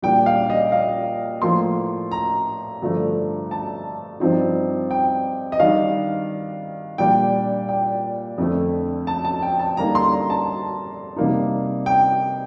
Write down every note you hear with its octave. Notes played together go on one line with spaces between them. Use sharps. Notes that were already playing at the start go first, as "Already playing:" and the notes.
A#2 G3 D4 G5
F5
D#5
F5
A2 F3 A#3 C6
A#5
G2 D3 F3 A3
A5
G2 F3 C4 D#4
G5
D#5
D#3 G3 D4 F5
A#2 G3 D4 G5
G5
F2 D3 A3
A5
A5
G5
A5
D3 G3 A#3 D#4 A#5
C6
A#5
A5
C3 G3 A#3 D#4
G5